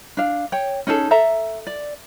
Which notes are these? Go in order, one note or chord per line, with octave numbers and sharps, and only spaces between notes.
D4 F5
C#5 G5
C#4 D#4 G#4 A4
A4 E5 A#5
D5